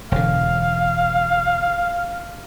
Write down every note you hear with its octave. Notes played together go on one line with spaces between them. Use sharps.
E1 D3 F5